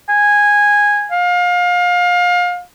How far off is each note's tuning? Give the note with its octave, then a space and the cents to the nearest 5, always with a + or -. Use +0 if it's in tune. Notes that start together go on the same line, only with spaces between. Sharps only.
G#5 -10
F5 +30